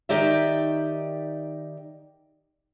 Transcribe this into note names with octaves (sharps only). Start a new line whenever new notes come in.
D#3 D#4 G4 D5 E5